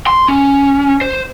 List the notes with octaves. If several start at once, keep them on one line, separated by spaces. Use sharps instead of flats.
C6
C#4
C5